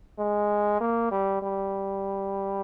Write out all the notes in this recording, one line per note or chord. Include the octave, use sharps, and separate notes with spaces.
G#3
A#3
G3
G3